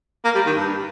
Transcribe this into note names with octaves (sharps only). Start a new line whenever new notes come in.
A#3
G3
D#3
G2